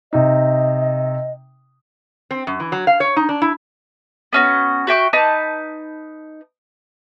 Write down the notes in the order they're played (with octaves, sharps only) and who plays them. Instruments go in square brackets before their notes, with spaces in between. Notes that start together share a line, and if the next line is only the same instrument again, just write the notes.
[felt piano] C3 D#4 [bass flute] D#5
[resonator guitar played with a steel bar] C4
F#2
E3
F#3
F5
C#5
D#4
D4
E4
[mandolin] B3 C#4 F#4
F#4 E5 G5 C#6
D#4 B4 A5